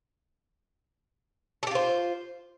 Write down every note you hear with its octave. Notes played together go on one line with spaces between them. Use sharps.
F4 G4 A4 C5